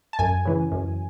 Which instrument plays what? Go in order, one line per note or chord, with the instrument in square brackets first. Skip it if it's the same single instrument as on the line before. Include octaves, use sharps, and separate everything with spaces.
[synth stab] A5
F#2 G#5
C#3 E3
F#2